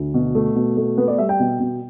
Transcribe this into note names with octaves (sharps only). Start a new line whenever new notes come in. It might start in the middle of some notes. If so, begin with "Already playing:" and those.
Already playing: D2
B2
A3
B2
A3
B3 B4
D5
G3 E5
G5
B2
B2